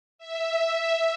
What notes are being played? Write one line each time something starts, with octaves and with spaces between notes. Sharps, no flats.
E5